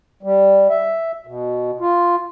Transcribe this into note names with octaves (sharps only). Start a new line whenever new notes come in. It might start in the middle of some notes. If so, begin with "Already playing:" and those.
G3
E5
B2
F4